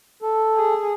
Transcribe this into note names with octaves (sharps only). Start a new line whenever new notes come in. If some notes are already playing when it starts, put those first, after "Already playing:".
A4
G#4